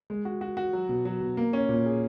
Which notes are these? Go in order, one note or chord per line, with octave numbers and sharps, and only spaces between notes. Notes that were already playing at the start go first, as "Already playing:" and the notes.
G#3
F#4
F#4
F#4
F#3
B2
F#3
B2
A#3
C#4
A#2
G#4